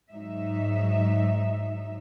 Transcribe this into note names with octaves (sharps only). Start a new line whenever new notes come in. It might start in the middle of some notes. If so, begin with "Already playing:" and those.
G#2 F#3 D#4 E5